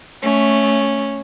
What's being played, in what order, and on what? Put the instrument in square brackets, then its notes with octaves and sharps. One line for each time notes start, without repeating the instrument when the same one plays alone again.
[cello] A3 [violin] C#4